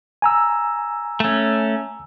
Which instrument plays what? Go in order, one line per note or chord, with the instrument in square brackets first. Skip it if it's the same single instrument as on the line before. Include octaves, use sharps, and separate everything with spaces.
[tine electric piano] G#5 A#5 E6
[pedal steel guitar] A3 C#4